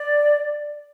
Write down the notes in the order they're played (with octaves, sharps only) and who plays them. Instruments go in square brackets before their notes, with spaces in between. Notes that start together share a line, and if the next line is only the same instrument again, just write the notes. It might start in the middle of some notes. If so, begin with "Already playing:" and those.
Already playing: [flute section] D5